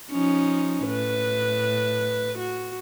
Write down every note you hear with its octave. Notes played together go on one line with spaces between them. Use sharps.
F3 C#4 D#4
A2 B4
F#4